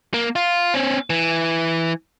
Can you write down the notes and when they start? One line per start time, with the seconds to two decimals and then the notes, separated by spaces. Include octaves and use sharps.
0.14 A#3
0.36 F4
0.74 C4 C#4
1.10 E3